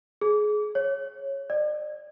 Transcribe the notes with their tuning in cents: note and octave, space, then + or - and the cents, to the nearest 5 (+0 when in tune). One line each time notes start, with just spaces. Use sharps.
G#4 +20
C#5 -10
D5 +45